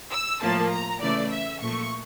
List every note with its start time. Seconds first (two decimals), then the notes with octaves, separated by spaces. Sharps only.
0.10 E6
0.41 A2 F3 A#3 A5
0.71 A#5
1.01 C#3 E3 A3 D5
1.30 E5
1.60 A#2 F3 A3 C#6